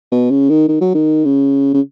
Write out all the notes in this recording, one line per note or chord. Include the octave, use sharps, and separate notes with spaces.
B2
C#3
D#3
D#3
F#3
D#3
C#3
C#3